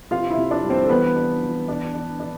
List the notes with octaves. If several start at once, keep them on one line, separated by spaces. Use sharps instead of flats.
C3 F4 F5
E4 E5
C3
D4 D5
G3
C4 C5
A4
E3 B3 B4
D4
E3
D4
D4
D4